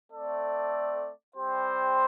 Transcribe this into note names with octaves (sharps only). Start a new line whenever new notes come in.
A3 C4 A4 D5
G3 C4 G4 C5